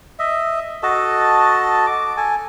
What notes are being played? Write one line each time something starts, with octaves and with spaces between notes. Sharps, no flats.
D#5 E5
F#4 A4 D#5 A5
D6
A4 G#5